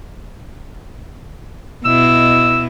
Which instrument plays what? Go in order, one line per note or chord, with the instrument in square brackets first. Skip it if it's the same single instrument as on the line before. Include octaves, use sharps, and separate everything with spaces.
[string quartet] B2 E4 D#5 [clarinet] E6